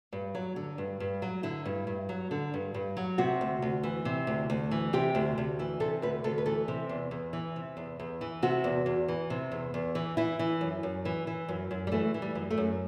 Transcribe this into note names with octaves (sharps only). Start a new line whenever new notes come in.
G2
F#3
D3
G2
G2
F#3
D3 E4
G2
G2
F#3
D3
G2
G2
F#3
C3 F#4
D2
D2
E3
C3
D2
D2
E3
C3 G4
D2
D2
E3
C3 A4
D2 B4
D2 A4
B4
E3 A4
C3
E2
E2
E3
C3
E2
E2
E3
C3 F#4
E2
E2
E3
C3
E2
E2
E3
E3 E4
E3
F#2
F#2
E3
E3
F#2
F#2
G3
E3 A3
E3
G3
F#2
A3
F#2